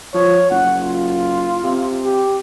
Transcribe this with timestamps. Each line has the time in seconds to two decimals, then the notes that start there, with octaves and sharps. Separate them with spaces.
0.14 F3 C#5
0.50 F#1 F#5
0.81 F4
1.64 C3
2.03 G4